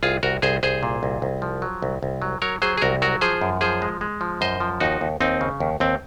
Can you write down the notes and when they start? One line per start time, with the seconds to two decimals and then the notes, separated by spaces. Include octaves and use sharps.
0.03 C2 F4 G#4
0.23 C2 F#4 A#4
0.42 C2 G#4 C5
0.63 C2 G#4 C5
0.83 A#2
1.03 C2
1.22 C2
1.42 F3
1.62 F#3
1.82 C2
2.03 C2
2.22 F#3
2.42 F#3 A#4 C#5
2.62 F#3 G#4 C5
2.77 G#4
2.82 C2 F#4 A#4
3.02 F#3 F#4 A#4
3.21 F3 G#4 C5
3.41 F#2
3.61 F3 G#4 C5
3.82 G#3
4.01 G#3
4.21 F3
4.41 F#2 C5 D#5
4.60 F3
4.80 D#2 D#4 F#4
5.01 D#2
5.20 D#2 C4 D#4
5.41 C#3
5.60 D#2
5.80 D#2 C4